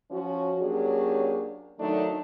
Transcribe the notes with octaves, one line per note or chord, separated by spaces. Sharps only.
F3 C#4 F#4
F#3 A#3 C#4 D4 G4 G#4
D#3 F#3 A3 D4 D#4